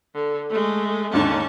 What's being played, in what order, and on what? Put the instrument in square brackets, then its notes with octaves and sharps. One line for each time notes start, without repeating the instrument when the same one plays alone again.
[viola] D3
G#3 A3
[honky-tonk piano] D#2 G#2 D3 [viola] C#4 A5